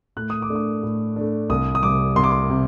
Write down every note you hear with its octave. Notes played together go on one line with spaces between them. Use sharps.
A2 F#6
D#6
D6
A3 D4
D#6
A2
A3 D4
C2 D#6
D#6
C3 G3 D6
C2 C6
D6
C6
C3